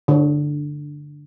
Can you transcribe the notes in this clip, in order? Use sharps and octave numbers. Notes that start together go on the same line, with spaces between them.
D3